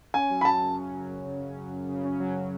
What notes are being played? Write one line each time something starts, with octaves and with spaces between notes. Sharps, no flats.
C#4 G#5
F#3
B5
F#2 A5
C#3
C#4
F#3
F#2
C#3
C#4
F#3
F#2
C#3
C#4
F#3